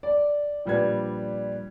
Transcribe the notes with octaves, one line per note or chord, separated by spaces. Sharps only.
D5
A#2 F3 G3 D4 B4 G#6